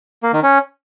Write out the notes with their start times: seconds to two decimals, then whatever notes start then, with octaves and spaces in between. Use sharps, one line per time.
0.23 A#3
0.33 D#3
0.43 C#4